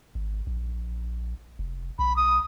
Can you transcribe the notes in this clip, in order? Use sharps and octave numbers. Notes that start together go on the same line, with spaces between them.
G#1
A#1
F1
B1 B5
D#6